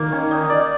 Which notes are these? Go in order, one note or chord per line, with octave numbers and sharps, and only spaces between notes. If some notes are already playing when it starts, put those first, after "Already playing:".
Already playing: D#3 A#3
C#4
D#4
D5